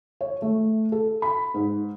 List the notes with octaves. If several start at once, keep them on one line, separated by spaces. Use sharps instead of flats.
C#5
A3
A4
B5
G#2